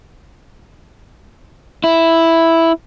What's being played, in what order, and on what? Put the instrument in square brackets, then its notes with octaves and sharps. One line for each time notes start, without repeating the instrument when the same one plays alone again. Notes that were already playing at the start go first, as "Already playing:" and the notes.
[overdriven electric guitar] E4